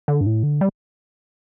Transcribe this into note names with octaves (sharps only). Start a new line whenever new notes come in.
D3
G2
A2
D3
G3